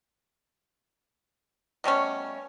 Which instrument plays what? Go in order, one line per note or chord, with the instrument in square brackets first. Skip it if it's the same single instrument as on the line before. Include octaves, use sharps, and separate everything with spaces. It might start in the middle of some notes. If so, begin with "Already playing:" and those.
[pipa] B2 G3 A3 C#4